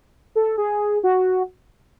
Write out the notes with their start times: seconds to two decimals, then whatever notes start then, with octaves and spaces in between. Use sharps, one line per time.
0.36 A4
0.58 G#4
1.04 F#4